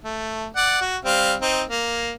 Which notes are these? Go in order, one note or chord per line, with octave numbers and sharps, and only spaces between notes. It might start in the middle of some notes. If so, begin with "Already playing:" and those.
A3
D5 F#5
F#4
G3 C4 F5
C4 D#4
A#3